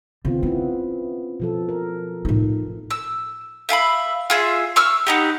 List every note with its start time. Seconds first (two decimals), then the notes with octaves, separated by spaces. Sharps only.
0.25 D3 B3 C4 F4
0.43 B3 C#4 E4
1.40 B2 F3 A4
1.69 A#4
2.25 A2 D#4
2.90 E6
3.69 E5 F5 G#5 B5
4.30 F4 G#4 E5
4.76 C#6 E6 F6
5.07 B3 D#4 G4